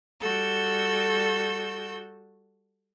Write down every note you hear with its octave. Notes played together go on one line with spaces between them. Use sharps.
G3 F#4 A4 E6 G6